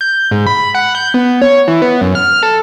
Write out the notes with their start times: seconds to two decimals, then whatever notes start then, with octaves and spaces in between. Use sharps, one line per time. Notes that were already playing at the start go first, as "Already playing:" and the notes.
0.01 G6
0.31 G#2
0.47 B5
0.75 F#5
0.95 G6
1.14 B3
1.42 C#5
1.68 E3
1.82 B3
2.01 F#2
2.15 F6
2.43 A4